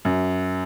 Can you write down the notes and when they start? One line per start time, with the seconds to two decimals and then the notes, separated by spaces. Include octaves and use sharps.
0.05 F#2